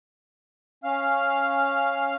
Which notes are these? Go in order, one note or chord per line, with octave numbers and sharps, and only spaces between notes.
C#4 F5 F6